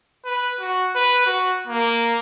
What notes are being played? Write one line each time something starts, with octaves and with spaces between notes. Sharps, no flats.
B4
F#4
B4
F#4
A#3